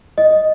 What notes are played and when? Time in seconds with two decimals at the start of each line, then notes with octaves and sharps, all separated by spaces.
0.18 D#5